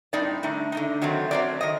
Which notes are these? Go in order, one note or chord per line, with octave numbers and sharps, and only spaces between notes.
A2 G3 C4 D#4 D5
D3 A3 D#4
D3 A3 D#4
D#3 F#3 A3 C4
D#3 F#3 A3 C4 D5
D#3 D#5